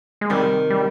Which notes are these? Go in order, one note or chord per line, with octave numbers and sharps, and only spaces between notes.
G#3
C3 D#3 G3
G3